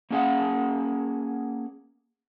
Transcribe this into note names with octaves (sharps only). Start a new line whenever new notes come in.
A#3 C#4 G#4 D5 F5 F#5